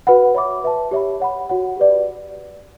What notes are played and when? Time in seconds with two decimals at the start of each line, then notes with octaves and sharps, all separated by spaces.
0.07 F#4 B4 F#5 B5
0.34 C#5 E5 B5 D6
0.64 B4 E5 A5
0.91 G4 C#5 E5 B5
1.20 C#5 F#5 B5
1.49 F#4 C#5 F#5
1.77 G4 B4 D5